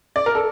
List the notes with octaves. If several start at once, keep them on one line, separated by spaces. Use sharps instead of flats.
D5
A#4
A4